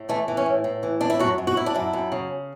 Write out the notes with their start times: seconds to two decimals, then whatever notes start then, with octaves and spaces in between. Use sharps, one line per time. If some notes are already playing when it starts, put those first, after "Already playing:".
Already playing: A2
0.09 E3 A3
0.28 E3
0.37 C#4
0.46 A2
0.64 A2
0.83 E3
1.01 A2 D4
1.10 E4
1.19 F#2 F#4
1.38 F#2
1.47 F#4
1.56 F#2 E4
1.66 D4
1.74 F#2 E4
1.93 F#2
2.12 C#3